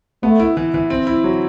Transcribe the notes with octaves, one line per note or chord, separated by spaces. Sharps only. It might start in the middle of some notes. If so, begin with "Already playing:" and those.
A3 B3
E4
E3
E3
C4
E4
F#3